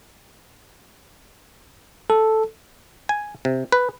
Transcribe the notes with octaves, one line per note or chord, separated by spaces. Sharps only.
A4
G#5
C3
B4